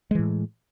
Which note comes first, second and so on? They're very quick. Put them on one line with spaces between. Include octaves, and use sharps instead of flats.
G#3 E3 A2